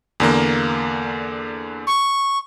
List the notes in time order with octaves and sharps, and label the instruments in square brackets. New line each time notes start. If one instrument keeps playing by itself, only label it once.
[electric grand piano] E2 D3 A#3
[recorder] C#6